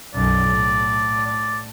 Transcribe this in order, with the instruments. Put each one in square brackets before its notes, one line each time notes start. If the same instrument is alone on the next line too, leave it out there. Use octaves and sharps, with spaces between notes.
[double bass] B1 F#2 [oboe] D5
[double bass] A2
[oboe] D5